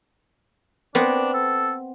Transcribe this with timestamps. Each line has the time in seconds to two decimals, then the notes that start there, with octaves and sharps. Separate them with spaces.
0.95 B3 C4 D4
1.33 A4